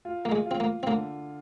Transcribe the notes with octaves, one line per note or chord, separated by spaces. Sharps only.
F4
A#3
G#3
F4
C4
A#3
C4
D3 A#3